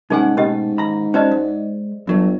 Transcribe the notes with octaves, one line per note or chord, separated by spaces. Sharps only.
C2 G#2 C#4 D#4 G#4 F#5 G#5
B2 A3 C#4 G4 D#5
D#2 A#5 B5
C#4 F#4 C5 D5 D#5 A5
G#3
G1 G2 F#3 A3